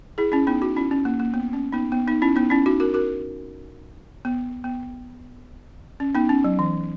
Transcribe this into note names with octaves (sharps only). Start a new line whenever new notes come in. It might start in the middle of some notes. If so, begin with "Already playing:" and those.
E4 G#4
C#4 E4
B3 D#4
D#4 F#4
C#4 E4
C#4
A#3
A#3
B3
C#4
B3 D#4
B3
B3 D#4
C#4 E4
B3 D#4
C#4 E4
D#4 F#4
F#4 A#4
F#4 A#4
B3
B3
C#4
B3 D#4
C#4
F#3
E3